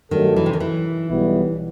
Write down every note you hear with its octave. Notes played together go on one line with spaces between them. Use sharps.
G2 D#3 F#3 A3 D#4 A4
E3
C3
D#3
E3
B1 B2 G3 B3 E4